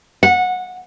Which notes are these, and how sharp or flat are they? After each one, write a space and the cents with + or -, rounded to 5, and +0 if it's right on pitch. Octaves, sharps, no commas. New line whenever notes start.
F#5 -20